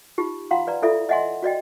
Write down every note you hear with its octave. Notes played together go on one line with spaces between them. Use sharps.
D#4 F4 G4
F4 F5 F#5 A#5 C6
B4 D5 A#5
E4 F4 A4 D5 E5
D#5 E5 F#5 G#5 C6
F#4 D5 D#5 G5